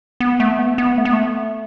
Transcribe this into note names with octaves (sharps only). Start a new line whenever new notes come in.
B3
A3
B3
B3
A3
B3
A3